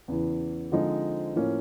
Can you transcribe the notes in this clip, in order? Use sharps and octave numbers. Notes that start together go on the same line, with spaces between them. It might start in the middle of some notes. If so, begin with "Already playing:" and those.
E2 C#3 E3
D3 F3 G#3 C4 D#4
A2 F3 A#3 C#4